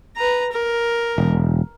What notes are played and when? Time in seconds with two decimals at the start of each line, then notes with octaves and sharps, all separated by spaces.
0.16 B4 A#5
0.52 A#4
1.18 E1